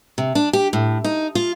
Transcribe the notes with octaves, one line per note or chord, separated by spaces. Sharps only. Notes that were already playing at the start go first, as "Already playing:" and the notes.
C3
D4
G4
A2
D#4
F4